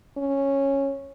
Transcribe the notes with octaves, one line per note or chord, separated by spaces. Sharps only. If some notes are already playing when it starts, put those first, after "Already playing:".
C#4